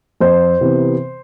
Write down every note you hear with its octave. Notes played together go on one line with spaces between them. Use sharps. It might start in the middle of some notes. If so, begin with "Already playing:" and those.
F2 C5
C3 E3 B3